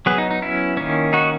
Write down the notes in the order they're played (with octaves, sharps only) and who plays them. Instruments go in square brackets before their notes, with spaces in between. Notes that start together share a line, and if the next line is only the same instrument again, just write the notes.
[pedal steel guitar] F#3 B3 G#4 B4
D#4
D#4
C#4 E4
D#3 A#3 C#4
D#4 F#4